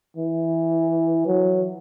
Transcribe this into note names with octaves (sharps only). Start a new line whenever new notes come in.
E3
F#3